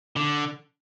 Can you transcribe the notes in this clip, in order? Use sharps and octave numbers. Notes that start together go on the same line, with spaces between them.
D3